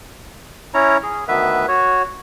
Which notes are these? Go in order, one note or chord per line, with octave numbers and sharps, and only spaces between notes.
C#4 E4 C#5 A#5
G#4
D2 D#3 B3 B4 E5
F#4 C#5